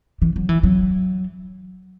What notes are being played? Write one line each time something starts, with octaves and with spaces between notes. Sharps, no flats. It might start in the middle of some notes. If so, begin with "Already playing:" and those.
E3
F#3
E3
F#3